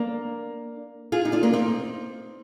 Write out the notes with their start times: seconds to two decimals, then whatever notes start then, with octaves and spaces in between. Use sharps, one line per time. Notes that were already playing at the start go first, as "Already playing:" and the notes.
Already playing: A#3 D4
1.12 F4 G#4
1.25 D#4
1.32 D4 F4
1.43 A#3 D4
1.53 C4 D#4